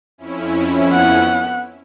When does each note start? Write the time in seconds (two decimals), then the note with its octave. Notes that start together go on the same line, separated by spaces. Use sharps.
0.18 F2 C#4 E4
0.90 B3 F#5